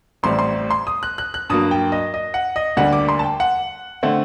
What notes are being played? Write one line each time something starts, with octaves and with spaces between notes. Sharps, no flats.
A1 A2 G3 C4 C6
C6
C6
D#6
F#6
F#6
F#6
G2 F#3 A#3 D#6
G5
D#5
D#5
F#5
D#5
D2 D3 G3 A#3 F#5
D6
C6
A5
G5
F#5
D3 A3 C4 F#5